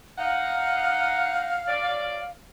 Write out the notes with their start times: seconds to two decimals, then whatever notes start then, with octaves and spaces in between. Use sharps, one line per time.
0.19 D#4 F5 F#5
1.68 F#3 C#4 D5